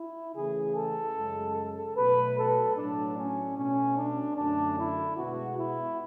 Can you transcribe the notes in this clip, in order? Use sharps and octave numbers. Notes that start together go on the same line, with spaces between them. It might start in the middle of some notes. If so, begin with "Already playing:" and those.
Already playing: E4
C#3 E3 A3 G#4
A4
F#2 C#3 G#3
A4
B2 F#3 A3 B4
A4
A2 F#3 A3 D4
C#4
B2 A3 C#4
D4
F#2 D3 A3 D4
E4
B2 G#3 B3 F#4
E4